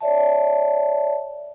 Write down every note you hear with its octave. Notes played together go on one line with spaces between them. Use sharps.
C#5 D5 E5 A5